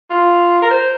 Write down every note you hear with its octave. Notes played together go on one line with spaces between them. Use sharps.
F4
A#4
C5